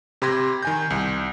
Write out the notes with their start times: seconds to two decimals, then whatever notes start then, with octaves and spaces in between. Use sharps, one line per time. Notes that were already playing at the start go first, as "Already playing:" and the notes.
0.22 C3 G4 B5 C6 G#6 A#6
0.63 D#3 G#5 G6
0.90 C2